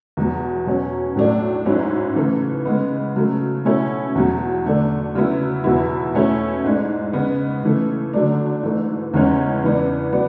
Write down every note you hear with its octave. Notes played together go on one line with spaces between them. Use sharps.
E2 B2 F#3
B2 F#3 C#4
A2 F#3 A3 D4
G#2 F#3 C#4 E4
C#3 E3 A3
C#3 G#3 B3
C#3 F#3 A3
B2 A3 C#4 E4
E2 B2 F#3
D3 A3 D4
C#3 F#3 B3 E4
E2 B2 F#3 B3 E4
B2 A3 C#4 E4
G#2 G#3 D4
C#3 G#3 B3
C#3 E3 A3
D3 F#3 A3 D4
G#2 E3 A3
E2 C#3 E3 G#3 C#4
C#3 E3 B3 D4
F#3 B3 D4